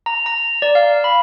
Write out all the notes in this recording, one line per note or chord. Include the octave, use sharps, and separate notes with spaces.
A#5
A#5
D5
F5
B5